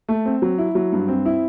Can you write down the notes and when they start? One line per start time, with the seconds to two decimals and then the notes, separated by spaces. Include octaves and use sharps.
0.09 A3
0.25 C4
0.42 F#3
0.58 E4
0.75 F#3
0.92 G2
1.08 C4
1.26 E4